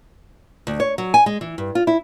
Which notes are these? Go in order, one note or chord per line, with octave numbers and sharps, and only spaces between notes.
D2
C#5
F#3
G#5
G#3
E3
G2
F4
E4